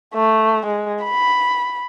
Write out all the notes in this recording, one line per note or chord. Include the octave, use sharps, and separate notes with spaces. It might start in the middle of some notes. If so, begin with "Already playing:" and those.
A3
G#3
B5